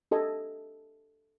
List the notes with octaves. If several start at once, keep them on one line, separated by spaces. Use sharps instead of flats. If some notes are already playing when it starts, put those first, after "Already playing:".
G4 A4 D#5 G#5